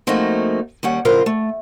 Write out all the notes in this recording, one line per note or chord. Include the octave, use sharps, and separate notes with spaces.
F3 A3 A#3 C4 D#4 F#4
D#2 G3 C#4 F#5
A2 C#3 F3 F4 A#4 C5
A3